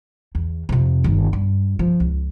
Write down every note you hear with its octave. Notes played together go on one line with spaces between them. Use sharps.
E2
F2 C3
G1 D#3
G2
F3
C#2